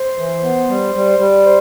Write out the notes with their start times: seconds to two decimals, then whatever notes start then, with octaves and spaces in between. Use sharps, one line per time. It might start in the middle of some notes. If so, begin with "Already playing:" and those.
Already playing: C5
0.18 E3
0.43 B3
0.69 G3
0.95 G3
1.19 G3
1.45 C5